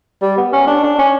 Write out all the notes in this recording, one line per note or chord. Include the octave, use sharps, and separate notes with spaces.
G3
B3
C#4
D4
D4
C#4